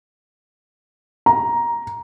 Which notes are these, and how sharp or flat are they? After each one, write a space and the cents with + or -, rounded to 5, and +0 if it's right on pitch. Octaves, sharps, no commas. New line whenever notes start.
A#5 +10